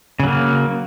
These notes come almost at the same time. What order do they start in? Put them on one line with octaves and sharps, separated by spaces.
C#3 F#3 A#3